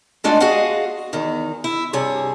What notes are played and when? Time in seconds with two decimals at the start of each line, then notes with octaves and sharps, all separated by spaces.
0.24 G#3 A3 D4 D#4 F4 F#4
0.40 F#4 G#4 D#5 F5 F#5
1.13 E2 D#3
1.64 E4
1.93 G2 C3 G#4 C#5